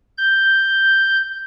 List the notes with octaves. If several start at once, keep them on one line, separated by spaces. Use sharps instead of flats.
G6